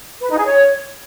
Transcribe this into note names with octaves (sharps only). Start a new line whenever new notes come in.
B4
D#4
G#4
C#5